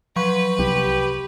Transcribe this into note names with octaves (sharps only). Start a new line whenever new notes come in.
F3 F#3 B4 C#6
C2 G4